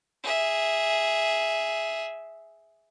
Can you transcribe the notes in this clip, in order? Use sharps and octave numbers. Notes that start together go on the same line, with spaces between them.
G#4 E5